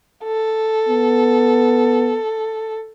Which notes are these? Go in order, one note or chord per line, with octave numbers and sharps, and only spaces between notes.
A4
B3